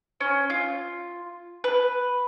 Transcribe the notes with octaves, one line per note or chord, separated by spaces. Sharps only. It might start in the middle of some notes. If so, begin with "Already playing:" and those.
C#4
F4
B4